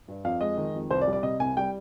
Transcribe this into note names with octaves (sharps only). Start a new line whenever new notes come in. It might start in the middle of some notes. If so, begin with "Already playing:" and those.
G2
F2 F5
G#3 D#5
D#3
F2
C2 C5
D5
G3
D5
C3 D#5
C2 G#5
G3 G5